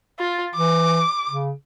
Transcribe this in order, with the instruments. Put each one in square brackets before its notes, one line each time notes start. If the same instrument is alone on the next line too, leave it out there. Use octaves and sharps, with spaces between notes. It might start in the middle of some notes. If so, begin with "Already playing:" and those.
[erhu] F4
[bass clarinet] E3 [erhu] D6
[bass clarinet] C#3